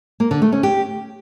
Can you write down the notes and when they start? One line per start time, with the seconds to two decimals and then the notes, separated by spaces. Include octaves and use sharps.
0.20 A#3
0.31 D3
0.42 A3
0.52 C#4
0.63 G4